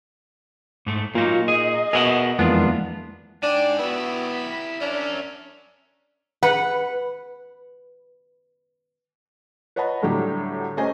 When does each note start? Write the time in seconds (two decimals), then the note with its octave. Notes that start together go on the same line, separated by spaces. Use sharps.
0.86 G#2 A3
1.15 A#2 F#3 A#3 D#4 F4
1.48 G#4 D#5
1.93 B2 G#4 A#4 E5 F#5
2.39 F2 E3 G#3 A#3 B3 D4 F4
3.43 G#2 D4 D5 G5 G#5
3.79 B3 E4 F#4 G4 E6
4.31 B6
4.81 C#4 D4 A#4 C#5 E5
6.43 B4 F#5
9.76 B4 C#5 D#5 F#5 A5 B5
10.02 A2 D3 F#3 G3 G4
10.77 A3 C#4 G4 C5 D#5 G#5